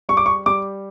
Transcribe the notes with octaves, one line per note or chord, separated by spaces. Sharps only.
G3 C#6
D6
C#6
G3 D6